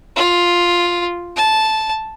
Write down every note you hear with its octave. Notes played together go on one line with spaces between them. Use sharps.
F4
A5